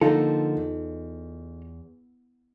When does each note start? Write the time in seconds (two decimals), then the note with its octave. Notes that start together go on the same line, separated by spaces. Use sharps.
0.01 D3 F3 A#3 D#4 F4 A4
0.57 E2